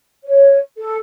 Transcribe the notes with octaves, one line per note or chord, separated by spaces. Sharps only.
C#5
A4